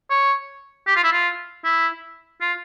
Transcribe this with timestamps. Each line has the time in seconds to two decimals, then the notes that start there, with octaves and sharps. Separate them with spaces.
0.10 C#5
0.87 G4
0.96 F4
1.04 E4
1.13 F4
1.64 E4
2.41 F4